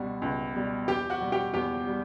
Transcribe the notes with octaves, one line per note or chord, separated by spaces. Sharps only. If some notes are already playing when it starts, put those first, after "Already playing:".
Already playing: C#2 B2 G3 F#4
C#2
B2 G3
E2 G4 G5
F#4 F#5
B2 G3
G4 G5
E2 G4 G5
G3